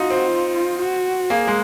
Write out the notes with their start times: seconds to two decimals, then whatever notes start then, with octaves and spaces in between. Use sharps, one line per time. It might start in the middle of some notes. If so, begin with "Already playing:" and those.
Already playing: D#4 F4 F#4
0.10 C4
0.28 F4
0.79 F#4
1.30 A#3 G#4
1.47 G#3